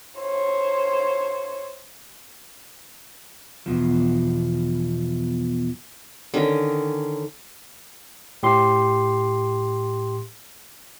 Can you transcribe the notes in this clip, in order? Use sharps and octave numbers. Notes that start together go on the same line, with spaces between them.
C5 C#5
E2 G#2 B2 F3
D3 D#3 C#4
A2 G4 C6